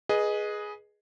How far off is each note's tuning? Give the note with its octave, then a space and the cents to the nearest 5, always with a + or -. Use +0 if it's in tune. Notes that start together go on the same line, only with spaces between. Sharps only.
G#4 +5 B4 -20 D#5 -10